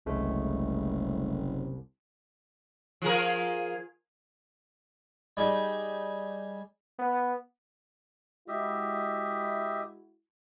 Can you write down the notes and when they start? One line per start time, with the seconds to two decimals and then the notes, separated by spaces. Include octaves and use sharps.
0.06 F#1 C2 G#3 A3
3.02 F3 G#4 A#4
5.37 G3 D#4 G#4
6.99 B3
8.48 G#3 E4 F#4 G4 D#5 E5